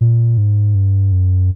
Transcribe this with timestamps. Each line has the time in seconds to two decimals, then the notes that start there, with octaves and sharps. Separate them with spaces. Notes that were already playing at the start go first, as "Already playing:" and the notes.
0.01 A#2
0.38 G#2
0.75 G2
1.12 F#2